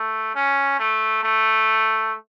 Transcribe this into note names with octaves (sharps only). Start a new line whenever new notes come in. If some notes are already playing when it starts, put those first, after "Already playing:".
Already playing: A3
C#4
A3
A3